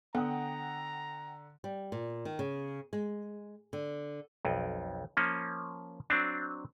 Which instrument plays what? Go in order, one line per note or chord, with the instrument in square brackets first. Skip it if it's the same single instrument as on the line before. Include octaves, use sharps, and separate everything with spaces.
[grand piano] D3 [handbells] B3 A4 [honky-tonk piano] F#5 G5 D#6 [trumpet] A#5
[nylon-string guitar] G3
A#2
D#3
C#3
G#3
D3
[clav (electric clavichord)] B1 F2
F3 A#3 C#4
F#3 C4 D4